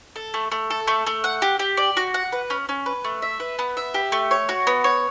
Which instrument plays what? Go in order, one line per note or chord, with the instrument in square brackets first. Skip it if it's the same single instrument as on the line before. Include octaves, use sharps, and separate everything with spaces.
[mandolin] A4
A3
A3
A4
A3
A3
F#5
G4
G4
D5
F#4
F#5
B4
C#4
C#4
B4
A3
E5
B4
B3
E5
G4
A3
C#5
F#4
B3
C#5